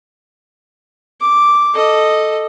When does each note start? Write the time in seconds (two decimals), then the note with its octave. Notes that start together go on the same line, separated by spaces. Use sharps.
1.21 D6
1.75 A4 D#5